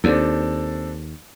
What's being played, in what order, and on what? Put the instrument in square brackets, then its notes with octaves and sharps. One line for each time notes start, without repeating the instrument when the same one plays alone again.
[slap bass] D#2 [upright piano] C4 D4 A4